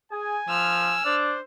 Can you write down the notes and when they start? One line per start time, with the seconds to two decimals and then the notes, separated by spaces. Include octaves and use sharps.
0.12 G#4 G#5
0.48 F3 E6 F6
1.05 D4 C5